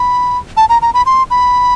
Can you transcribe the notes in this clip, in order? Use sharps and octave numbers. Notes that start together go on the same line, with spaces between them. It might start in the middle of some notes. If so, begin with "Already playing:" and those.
Already playing: B5
A5
A#5
A#5
B5
C6
B5